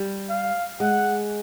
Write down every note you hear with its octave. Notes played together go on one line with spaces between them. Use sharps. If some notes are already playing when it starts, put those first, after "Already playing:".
Already playing: G3
F5
G#3 F#5